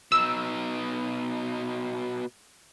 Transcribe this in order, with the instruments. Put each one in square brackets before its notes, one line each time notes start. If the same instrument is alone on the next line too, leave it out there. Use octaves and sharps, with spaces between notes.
[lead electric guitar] B2 D#4 [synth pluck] E6